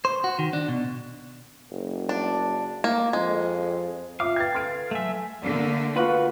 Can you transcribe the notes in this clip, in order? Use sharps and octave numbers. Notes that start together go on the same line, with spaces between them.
C5
F#4
D#3
D4
B2
F#1
D4
A#3
F2 G#3
F4 E5 F5 D6
B4 G5 G#6 A6
A4 B4 C6 F6 D7
F#3 A3 E5 G#5
D3 A3 A#3
F4 F#4 A4 B4